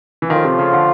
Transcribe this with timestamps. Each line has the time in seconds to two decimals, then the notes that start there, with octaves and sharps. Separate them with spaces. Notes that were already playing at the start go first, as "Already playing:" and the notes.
0.22 E3
0.30 D#3 F3 A3 C#4 F4
0.44 C3
0.59 C#3
0.73 D3